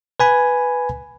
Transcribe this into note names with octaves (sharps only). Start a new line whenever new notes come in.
B4 G#5 B5